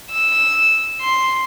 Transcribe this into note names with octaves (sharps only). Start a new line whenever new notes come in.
E6
C6